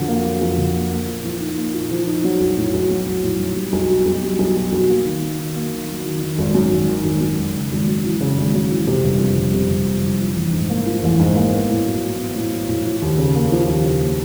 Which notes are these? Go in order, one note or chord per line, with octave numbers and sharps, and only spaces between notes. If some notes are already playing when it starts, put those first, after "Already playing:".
Already playing: F2 D3 F#3
A#3
F#3
F2
D3
A#3
A#3
A#2
F3
D#4
A#3
A#2
F3
D#4
F#3
B1
A2
B1
F#3
B1
A2
B1
G3
B1
B2
B1
G3
B1
B2
B1
A#3
D#3
F#3
D#3
A#3
D#3
F#3
D#3
D#3
G#1
F#2
G#1
D#3
G#1
F#2
G#1
C#3
G#1
F#2
E3
C#3
G#1
F#2
E3
C3
G1
F2
G1
C3
G1
F2
G1
F3
A1
G#2
A#3
F3
A1
G#2
A#3
B3
A2
F#3
A2
B3
A2
F#3
A2
F3
D#2
C#3
A#3
F3
D#2
C#3
A#3